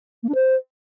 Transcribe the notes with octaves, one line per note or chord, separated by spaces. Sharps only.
A#3
D4
C5